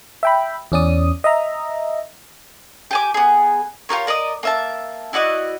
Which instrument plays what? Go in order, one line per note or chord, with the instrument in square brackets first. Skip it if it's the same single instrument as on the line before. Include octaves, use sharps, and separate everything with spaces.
[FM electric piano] E5 G5 B5
E2 C#4 D5 D#6
D#5 E5 A#5
[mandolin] G4 G#5 D6
B3 G#4
F4 G4 A#4 C#5
A#4 D5 D#5 D#6
A#3 E5 A5
E4 F#4 D5 D#5